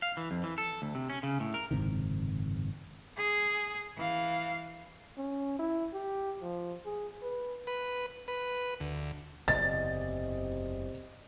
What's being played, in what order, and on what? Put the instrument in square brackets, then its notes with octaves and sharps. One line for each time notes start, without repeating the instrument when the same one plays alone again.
[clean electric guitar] F5
E3
F2
E3
A4
D2
C3
C#4
C#3
A2
A#4
[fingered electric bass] F#1 G#2 C3 D#3
[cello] G#4
E3 F5
[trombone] C#4
E4
G4
F3
G#4
B4
[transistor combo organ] B4
B4
D2
[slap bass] F#1 E2 A2 [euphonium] C3 [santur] D5 D#5 [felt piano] A6